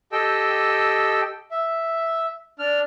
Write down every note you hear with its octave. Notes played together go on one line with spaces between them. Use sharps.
G4 A4 D#5 G5 E6
E5
D4 F6